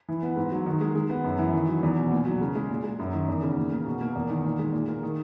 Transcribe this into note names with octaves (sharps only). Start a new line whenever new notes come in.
E3
B3
G#2
F#3
D#3
G#3
G#3
B3
F#2
E3
D#3
F#3
E2
B2
A#2
F#3
C#3
G#3
A#2
G#3
F#2
D#3
E2
C#3
A#2
A#3
B2
A#3
E2
D#3
A#2
G#3
A#2
A#3
D#3